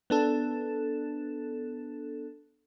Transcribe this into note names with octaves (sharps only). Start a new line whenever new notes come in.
B3 D4 A4